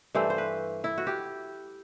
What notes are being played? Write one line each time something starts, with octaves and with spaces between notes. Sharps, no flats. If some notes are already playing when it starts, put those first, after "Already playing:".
G2 E3 A3 C5
C5
B4
E4
F#4
G4